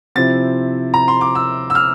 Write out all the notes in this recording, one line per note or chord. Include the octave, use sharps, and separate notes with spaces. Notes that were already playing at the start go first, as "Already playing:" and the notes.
C3 F3 C4 E4 A6
A#5
C6
D6
E6
E6
F6